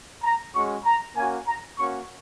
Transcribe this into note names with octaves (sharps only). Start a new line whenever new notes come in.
A#5
G#3 C#4 F#4 C#6
A#5
A#3 C#4 F#4 G#5
A#5
A#3 C#4 F#4 C#6